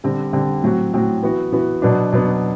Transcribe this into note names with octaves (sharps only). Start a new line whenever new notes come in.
D3 G3 C4
D3 G3 C4
A2 F#3 C4 F#4
A2 F#3 C4 F#4
E3 B3 F#4
E3 B3 F#4
B2 F#3 B3 D4
B2 F#3 B3 D4